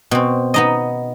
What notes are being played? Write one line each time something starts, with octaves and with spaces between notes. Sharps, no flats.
B2 C4
B3 D#4 D#5